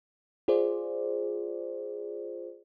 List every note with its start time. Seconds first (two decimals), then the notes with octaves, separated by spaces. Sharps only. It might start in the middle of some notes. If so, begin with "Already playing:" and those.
0.48 F4 G#4 C5 D5